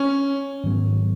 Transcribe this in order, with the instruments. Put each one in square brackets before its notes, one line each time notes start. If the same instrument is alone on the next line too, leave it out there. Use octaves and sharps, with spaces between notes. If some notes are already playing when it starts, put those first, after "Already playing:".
Already playing: [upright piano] C#4
[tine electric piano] G#2 D#3 F#3 B3